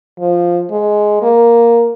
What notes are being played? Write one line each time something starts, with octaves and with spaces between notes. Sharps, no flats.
F3
G#3
A#3